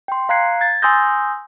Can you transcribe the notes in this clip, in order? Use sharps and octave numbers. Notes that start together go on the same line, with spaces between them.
G5 C6
F5 A#5 F#6 G#6 C7 C#7
G#6 A6
G#5 C6 D#6 E6 G6 A#6